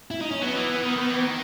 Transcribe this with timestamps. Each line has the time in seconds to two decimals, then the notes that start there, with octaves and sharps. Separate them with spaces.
0.11 E4
0.21 D#4
0.31 C#4
0.42 F#3 B3
0.56 E3
0.70 E3
0.84 D#3
0.97 D#3
1.10 E3
1.22 D#3